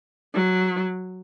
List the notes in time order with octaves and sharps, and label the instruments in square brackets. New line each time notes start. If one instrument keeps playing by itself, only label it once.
[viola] F#3